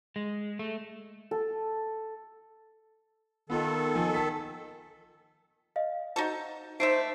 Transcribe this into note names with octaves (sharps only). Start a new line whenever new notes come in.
G#3
A3
A4
D#3 B3 F4 A4
F3 G#5
A5 B6
D#5 F5
D#4 F#4 A4 C5 D#5
A3 A#3 D#4 C5 E5 C7 D7